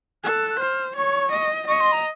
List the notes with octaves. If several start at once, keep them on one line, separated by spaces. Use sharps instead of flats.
A4 F#6
F#6
C5 F6
C#5 C#6
D#5
D#5 C#6
C6
A#5